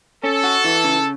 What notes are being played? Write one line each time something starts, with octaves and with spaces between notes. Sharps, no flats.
C#4 A4
F#4
E3
C#3